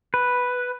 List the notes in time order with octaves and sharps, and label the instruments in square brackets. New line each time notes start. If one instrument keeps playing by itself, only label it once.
[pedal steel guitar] B4